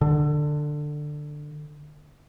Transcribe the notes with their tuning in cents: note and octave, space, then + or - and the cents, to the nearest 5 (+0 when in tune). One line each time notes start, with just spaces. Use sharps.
D3 +15